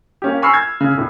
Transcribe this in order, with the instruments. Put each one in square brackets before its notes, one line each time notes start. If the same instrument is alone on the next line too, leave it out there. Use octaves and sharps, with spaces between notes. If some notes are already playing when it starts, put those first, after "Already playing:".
[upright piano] A#3 C#4 G4
G#5 B5 C#6 E6 F6 C7
G#6
C#3
E1 A2